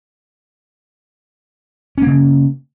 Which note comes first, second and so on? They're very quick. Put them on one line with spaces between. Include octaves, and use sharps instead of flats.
C#4 A#3 C#3